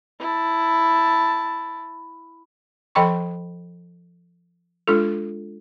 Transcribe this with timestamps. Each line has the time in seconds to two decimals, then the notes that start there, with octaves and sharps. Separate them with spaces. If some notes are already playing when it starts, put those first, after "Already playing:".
0.20 E4 A5
2.95 F3 A4 D#5 G5 B5 C#6
4.87 G#3 D4 F4 A4